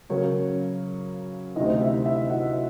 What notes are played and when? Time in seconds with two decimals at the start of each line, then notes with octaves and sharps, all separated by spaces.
0.10 C#3 F#3 A#3 C#4 C#5
1.56 D2 C3 D#3 D#4 D#5
1.81 E4 E5
2.05 E4 E5
2.30 F#4 F#5